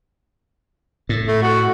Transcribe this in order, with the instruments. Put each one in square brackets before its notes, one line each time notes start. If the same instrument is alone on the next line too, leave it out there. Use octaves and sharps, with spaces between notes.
[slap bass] A2
[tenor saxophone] A3
F#4